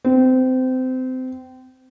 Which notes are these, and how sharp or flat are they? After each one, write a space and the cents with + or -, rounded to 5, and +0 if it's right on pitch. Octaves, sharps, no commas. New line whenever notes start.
C4 -25